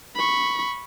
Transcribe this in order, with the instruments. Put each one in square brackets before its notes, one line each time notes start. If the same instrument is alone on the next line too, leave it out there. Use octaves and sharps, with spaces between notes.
[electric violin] B5 C#6